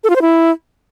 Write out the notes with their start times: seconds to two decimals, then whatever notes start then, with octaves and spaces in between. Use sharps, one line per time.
0.04 A4
0.10 F4
0.16 C5
0.22 E4